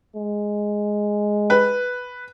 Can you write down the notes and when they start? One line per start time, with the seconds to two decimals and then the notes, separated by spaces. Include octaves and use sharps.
0.16 G#3
1.50 B4